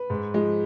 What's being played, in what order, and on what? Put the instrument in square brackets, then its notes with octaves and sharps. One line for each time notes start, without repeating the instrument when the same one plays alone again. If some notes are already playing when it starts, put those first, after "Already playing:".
Already playing: [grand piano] B4
G#2
F3 G#3